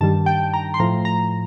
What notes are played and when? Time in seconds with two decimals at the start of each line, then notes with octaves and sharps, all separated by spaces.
0.01 G2 D#3 G3 A5
0.26 G5
0.54 A#5
0.74 C6
0.80 A2 F3 A#5
1.05 A#5